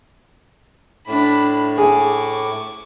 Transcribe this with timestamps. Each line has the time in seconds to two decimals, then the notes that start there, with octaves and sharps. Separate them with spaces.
1.08 A2 D4 B5
1.78 G#4 C#6 D6